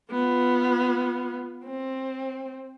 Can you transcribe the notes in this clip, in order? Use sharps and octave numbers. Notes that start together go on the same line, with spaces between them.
B3 F4
C4